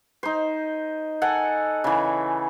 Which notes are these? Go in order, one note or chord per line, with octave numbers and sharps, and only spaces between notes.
D#4 C5
A4 F#5 G#5
C#3 E3